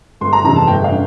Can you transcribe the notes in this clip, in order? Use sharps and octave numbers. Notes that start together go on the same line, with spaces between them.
G1 C6
A#5
F2 C3 E3 A#5
A5
G1 G5
F5
D3